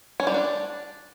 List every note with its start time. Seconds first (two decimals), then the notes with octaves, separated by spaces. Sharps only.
0.20 C#4
0.27 G3
0.34 D4